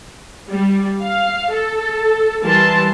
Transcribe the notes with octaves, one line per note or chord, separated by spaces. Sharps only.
G3
F5
A4
E3 G3 A#4 A5 C6